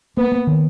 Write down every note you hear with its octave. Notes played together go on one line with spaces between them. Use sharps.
A#3 B3
A#3
D#3